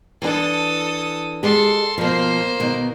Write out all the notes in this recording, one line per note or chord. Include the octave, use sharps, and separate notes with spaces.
E3 D4 A4 D#6
G#3 G4 A4 C6
B2 F3 A#3 C5
B2 D#3